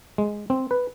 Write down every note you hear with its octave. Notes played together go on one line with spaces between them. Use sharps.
G#3
C4
B4